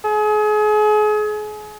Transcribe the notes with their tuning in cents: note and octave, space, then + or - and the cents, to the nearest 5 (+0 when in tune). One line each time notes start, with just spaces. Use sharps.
G#4 +35